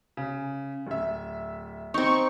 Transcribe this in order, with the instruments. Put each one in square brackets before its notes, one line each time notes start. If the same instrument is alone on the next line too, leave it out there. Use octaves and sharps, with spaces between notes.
[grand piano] C#3
D1 E5
[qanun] C4 D#4 [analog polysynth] C#6